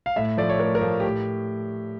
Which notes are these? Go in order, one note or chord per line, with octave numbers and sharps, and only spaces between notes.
F5
A2 E5
F3 A3 D5
C#5
A2 A#4
A#4
F3 A3
A2 G4